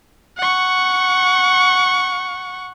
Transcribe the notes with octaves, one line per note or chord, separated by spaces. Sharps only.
F#5 C#6